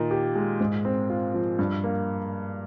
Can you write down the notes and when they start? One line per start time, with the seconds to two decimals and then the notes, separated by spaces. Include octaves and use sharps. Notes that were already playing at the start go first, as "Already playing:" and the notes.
Already playing: A#2 D#3 D#4
0.11 G4
0.35 G#3
0.60 G#2
0.85 C4
1.10 F4
1.34 F3
1.59 G2
1.84 A#3